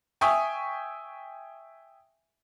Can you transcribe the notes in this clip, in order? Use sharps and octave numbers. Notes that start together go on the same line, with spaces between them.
E5 G5 G#5 C#6 D#6